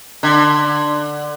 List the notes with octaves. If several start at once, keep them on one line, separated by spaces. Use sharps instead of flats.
D3